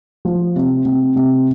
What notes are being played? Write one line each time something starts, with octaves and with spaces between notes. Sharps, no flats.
F3
C3
C3
C3